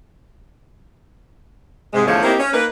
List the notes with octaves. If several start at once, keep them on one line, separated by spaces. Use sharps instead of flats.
G#2 C3 G#3
E2 D3 F3 A3 C#5
A#3 C4 D#4 E4 G4
C#4
A#3 D#4 B4